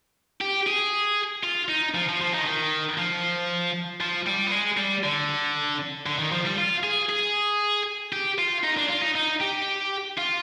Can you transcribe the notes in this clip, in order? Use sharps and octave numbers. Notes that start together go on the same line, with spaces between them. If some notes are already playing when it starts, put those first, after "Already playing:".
G4
G#4
F4
D#4
F3
F3
F3
D#3
D#3
F3
F3
G3
B3
G#3
G3
D3
D3
D#3
F3
G3
F4
G#4
G#4
G4
F4
D#4
D4
F4
D#4
D#4
G4
F4